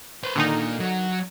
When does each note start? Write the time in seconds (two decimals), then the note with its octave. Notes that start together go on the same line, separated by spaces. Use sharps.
0.23 B4 C5
0.36 A#2 D3 D#3 A#3 D#4
0.80 F#3